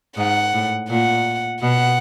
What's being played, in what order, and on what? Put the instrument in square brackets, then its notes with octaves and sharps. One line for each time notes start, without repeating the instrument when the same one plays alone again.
[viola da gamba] G#2 [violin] F#5
[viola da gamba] A2
[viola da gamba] A#2 [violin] F#5
[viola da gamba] B2 [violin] F#5